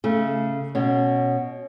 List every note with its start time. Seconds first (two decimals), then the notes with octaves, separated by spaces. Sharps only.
0.04 C#3 A3
0.75 B2 C#4